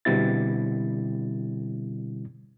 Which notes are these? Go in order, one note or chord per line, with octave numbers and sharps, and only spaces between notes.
B2 D3 G3 C4 E4 A6